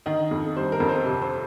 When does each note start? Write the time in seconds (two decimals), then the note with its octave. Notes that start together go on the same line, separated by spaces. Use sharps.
0.06 D#3 D#5
0.31 F2
0.57 G3 C5
0.72 A#4
0.80 F2
0.89 C5
1.05 C3
1.22 C5